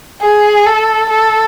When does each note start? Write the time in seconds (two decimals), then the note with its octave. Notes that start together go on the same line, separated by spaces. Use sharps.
0.21 G#4
0.66 A4
1.10 A4